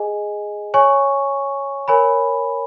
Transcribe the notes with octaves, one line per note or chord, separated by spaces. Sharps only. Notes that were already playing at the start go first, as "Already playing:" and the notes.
Already playing: G#4 D#5 G#5
C#5 G#5 C#6
A#4 C#5 G#5 B5